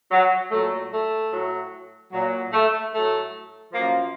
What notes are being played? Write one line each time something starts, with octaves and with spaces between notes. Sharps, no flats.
F#3
A#2 F#3 A3
A3
A2 F#3
A#2 F#3
A3
A2 F#3 A3
F#2 F3 A#3